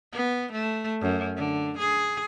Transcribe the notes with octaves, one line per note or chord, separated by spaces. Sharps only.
B3
A3
F#2
D3
G#4